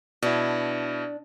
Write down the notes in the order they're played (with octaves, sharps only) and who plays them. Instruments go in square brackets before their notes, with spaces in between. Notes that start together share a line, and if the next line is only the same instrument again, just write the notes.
[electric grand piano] B2 E4 [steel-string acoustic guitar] D4